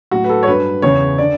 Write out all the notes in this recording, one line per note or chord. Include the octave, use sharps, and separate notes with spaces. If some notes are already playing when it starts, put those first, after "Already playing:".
A2 F#3 F#4
B4
A4
C#5
G2 F#3 B4
E2 C#3 E3 C#5
D3 D5